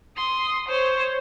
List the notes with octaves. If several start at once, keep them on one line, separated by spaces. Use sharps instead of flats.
C6 D#6
C5 C#5